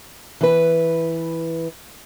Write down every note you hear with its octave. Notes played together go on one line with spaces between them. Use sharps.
E3 B4